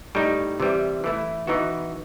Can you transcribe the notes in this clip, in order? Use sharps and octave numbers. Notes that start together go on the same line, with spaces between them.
A2 G3 D#4
C3 E3 G3
E3 A3 E4
E3 B3 D#4 F#4